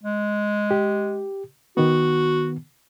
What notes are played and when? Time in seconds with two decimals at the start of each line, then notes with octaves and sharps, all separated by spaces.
0.03 G#3
0.71 G4
1.77 D#3 B3 F#4